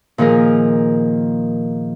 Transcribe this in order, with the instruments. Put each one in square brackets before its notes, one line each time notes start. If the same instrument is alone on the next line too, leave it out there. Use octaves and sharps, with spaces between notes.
[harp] A#2 D#3 F3 G#4 A#4